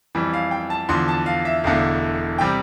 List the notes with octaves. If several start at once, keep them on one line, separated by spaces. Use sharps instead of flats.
F2 E3 G3
F5
G5
A5
E2 D3 F3 C6
A5
F5
E5
E1 E2 D3 A3 F5
C3 G3 G5